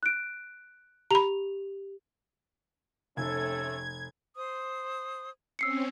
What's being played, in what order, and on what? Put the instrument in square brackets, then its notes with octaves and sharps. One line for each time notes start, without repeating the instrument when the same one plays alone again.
[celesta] F#6 D7
[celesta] G4 F7 [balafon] A#5 B5
[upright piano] F1 [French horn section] C3 A3 C#4 [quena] A4 [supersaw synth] G#6
[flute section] C5 C6 D#6
[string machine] C4 C#4 [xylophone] E6 C7 C#7